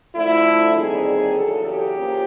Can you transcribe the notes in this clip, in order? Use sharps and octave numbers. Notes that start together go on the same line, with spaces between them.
D3 F3 A3 D4 E4
D#2 D3 G3 C4 D#4 G#4
E2 C#3 F#3 A4
G4
F3 A#3 C#4